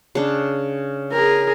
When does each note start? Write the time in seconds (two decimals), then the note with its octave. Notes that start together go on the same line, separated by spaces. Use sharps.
0.15 C#3 D4
1.12 G#4 A#4